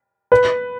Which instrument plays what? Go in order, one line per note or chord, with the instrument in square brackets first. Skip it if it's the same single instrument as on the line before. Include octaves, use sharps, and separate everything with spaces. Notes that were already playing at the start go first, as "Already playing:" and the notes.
[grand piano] B4